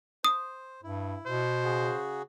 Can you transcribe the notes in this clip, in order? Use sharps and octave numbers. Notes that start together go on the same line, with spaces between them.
C5 D#6
G2 E4
B2 C5
C#3 F#4 G#4